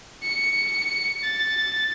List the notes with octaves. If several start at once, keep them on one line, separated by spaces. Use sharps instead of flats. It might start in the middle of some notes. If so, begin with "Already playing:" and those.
C#7
A6